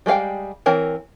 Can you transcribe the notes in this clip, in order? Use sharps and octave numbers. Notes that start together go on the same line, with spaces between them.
G3 G#3 A4 F5 G5
E3 C4 A#4 C#5